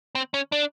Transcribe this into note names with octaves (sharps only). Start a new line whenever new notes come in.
C4
C#4
D4